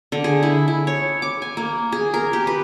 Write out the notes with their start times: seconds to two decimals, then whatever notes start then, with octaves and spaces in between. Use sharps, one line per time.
0.12 D3
0.24 G#4
0.43 E4
0.68 E4
0.87 C#5
1.22 D6
1.42 G#5
1.57 A#3
1.92 G#4
2.14 A#4
2.33 G4
2.47 B4